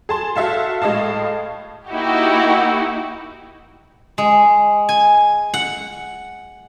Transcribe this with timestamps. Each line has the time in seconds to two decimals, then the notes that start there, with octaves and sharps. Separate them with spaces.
0.09 G#4 A5 C6
0.36 F#4 A4 E5 F5 A5
0.82 A2 G#3 D#5 F5 A5
1.88 A#3 D#4 E4 F#4 G4
4.18 G#3
4.89 G#5
5.54 F#5